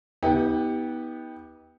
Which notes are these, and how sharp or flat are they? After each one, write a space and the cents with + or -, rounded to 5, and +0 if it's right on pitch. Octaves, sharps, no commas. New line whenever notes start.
B3 -10 D#4 +40 G4 +0